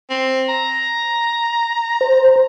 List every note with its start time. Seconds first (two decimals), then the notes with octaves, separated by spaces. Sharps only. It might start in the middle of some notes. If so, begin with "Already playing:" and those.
0.10 C4
0.48 A#5
2.01 C5